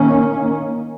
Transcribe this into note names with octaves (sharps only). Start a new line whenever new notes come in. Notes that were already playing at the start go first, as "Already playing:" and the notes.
Already playing: D#3 A#3 C#4